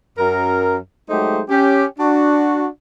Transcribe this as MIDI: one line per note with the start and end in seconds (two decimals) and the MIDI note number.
0.18 0.76 42
0.18 0.76 70
1.09 1.41 54
1.09 1.41 56
1.09 1.41 57
1.09 1.41 63
1.09 1.41 67
1.09 1.41 72
1.49 1.85 61
1.49 1.85 67
1.99 2.66 62
1.99 2.66 66